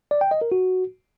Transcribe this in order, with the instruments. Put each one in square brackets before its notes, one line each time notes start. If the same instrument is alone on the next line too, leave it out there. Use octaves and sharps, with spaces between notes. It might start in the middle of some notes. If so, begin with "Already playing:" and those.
[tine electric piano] D5
G5
D#5
A#4
F#4